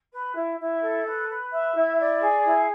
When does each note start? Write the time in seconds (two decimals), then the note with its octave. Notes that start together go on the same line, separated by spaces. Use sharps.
0.11 B4
0.35 E4
0.58 E4
0.81 A4
1.05 B4
1.28 B4
1.51 E5
1.74 E4
1.98 D5
2.21 G#4
2.45 E4